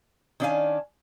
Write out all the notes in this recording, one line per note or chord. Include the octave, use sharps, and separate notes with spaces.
D#3 C#4 D4 A4 F5 G#5